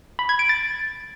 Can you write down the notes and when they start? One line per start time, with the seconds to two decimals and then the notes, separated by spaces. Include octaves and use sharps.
0.19 B5
0.29 G#6
0.39 D7
0.49 A6